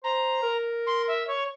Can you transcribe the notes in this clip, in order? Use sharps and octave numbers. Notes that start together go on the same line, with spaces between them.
C5 A#5
A#4
C6
E5
C#5